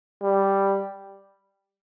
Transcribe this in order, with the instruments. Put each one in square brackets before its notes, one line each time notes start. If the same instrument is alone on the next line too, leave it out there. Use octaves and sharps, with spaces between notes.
[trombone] G3